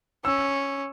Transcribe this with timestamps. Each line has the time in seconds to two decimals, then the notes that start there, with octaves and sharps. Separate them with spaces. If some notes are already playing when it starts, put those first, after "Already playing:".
0.25 C#4 E6